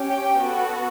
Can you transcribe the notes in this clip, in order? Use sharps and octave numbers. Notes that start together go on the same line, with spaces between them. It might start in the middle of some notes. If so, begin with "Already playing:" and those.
Already playing: C#4 G4
G5
B3 F#4 A4